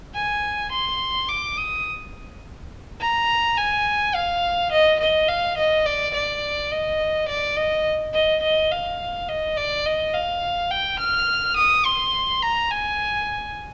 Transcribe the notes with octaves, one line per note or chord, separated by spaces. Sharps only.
G#5
C6
D6
D#6
A#5
G#5
F5
D#5
D#5
F5
D#5
D5
D5
D#5
D5
D#5
D#5
D#5
F5
D#5
D5
D#5
F5
G5
F6
D#6
C6
A#5
G#5